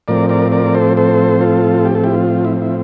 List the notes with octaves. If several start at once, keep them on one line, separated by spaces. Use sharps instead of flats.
A2 F3 C4 A#4 D5
A#4 D5
A#4 D5
A4 C5
A4 C5
F4 A4
G4
A4
E4 G4
F4
E4
E4